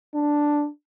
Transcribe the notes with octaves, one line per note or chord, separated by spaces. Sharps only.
D4